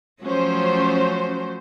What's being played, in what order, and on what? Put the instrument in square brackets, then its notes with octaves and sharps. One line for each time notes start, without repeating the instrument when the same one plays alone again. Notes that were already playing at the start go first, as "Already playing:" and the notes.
[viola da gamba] F3 F#3 A3 [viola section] C#4 C5